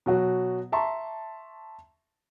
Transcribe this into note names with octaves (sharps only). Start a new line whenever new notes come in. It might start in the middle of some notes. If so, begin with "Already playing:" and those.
B2 F#3 F#4
E5 A5 A#5 C6 C#6